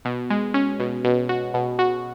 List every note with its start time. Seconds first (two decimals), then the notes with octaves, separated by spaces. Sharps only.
0.05 B2
0.30 G#3
0.54 C#4
0.80 B2
1.04 B2
1.29 F#4
1.54 B2
1.79 F#4